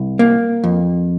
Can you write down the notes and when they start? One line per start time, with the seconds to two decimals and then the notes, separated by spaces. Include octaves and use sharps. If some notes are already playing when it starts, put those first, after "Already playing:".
Already playing: C2
0.19 A#3
0.64 F2